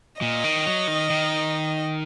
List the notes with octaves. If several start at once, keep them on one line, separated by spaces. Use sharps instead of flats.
A#2 D#5
D#3
F#3
D#3
D#3